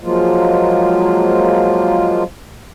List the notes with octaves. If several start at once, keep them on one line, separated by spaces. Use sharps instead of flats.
F3 F#3 G#3 A#3 F4